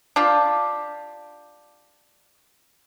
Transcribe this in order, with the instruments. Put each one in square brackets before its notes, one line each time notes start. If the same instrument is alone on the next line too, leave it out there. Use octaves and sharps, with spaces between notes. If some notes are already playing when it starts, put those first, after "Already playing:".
[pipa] D4 F4 G4